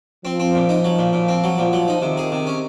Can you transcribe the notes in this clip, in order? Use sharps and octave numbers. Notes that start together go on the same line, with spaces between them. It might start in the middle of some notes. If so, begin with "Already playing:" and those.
F3 C4
C4
A#2
D#4
F#3
A#2
A#2
C4
F#3
A#2 F3
F#3
D#4
C3 D#3
G#4
C3
C#4